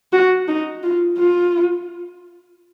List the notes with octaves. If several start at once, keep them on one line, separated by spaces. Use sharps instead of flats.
F#4
D#4
F4
F4